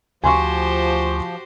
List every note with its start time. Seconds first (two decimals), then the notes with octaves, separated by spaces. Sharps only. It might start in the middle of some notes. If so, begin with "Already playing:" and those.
0.24 D2 F3 F#4 G4 C5 G#5 C6 C#6